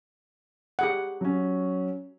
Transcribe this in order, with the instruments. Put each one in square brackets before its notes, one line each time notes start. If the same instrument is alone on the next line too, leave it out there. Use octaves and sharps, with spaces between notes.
[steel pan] G4 G#4 F#5
[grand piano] F#3 C#4